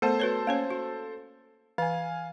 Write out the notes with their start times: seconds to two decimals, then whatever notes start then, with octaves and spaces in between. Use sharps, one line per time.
0.02 A3 B3 A4 A#4 C5 A5
0.20 F#4 B4 C#5
0.47 A#3 C#4 C#5
0.71 F#4
1.78 E3 F5 G#5